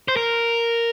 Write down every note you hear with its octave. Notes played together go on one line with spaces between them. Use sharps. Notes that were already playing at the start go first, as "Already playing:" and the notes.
C5
A#4